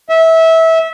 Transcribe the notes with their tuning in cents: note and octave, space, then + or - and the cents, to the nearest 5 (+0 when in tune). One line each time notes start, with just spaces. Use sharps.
E5 -20